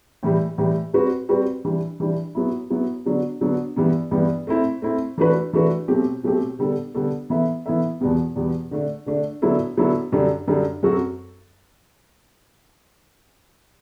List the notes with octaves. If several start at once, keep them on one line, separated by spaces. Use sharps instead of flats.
A2 E3 G3
A2 E3 G3
G3 C4 F#4 B4
G3 C4 F#4 B4
E3 G3 D4
E3 G3 D4
F#3 B3 E4
F#3 B3 E4
D3 F#3 B3 D4
D3 F#3 B3 D4
G2 E3 G3 B3
G2 E3 G3 B3
A3 C4 E4
A3 C4 E4
E3 A3 D4 F#4 B4
E3 A3 D4 F#4 B4
B2 F#3 A3 C4 G4
B2 F#3 A3 C4 G4
D3 G3 B3 D4 A4
D3 G3 B3 D4 A4
E3 B3 E4 A4 E5
E3 B3 E4 A4 E5
E2 B2 G3 B3
E2 B2 G3 B3
D3 A3 D4
D3 A3 D4
D3 F#3 B3 E4 A4
D3 F#3 B3 E4 A4
F#2 D3 G3 D4 A4
F#2 D3 G3 D4 A4
F#2 F#3 C4 F#4 A4